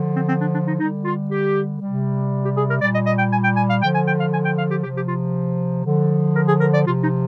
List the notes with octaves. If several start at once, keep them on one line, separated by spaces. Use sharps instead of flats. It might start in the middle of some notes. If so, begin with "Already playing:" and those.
Already playing: D3 F3
C4
C4
D4
D4
D#4
D3 G3 D#4
F4
G4
C3 G3
G4
G#4
A#4
A#2 G3 D5
D#5
D#5
G5
G#5
G5
G#5
F5
D3 F3 G5
G#5
G5
F5
G#5
G5
F5
G4
C3 F3 G4
G4
F4
D3 F3
A#4
G#4
A#4
D5
C3 F3 F4
D#4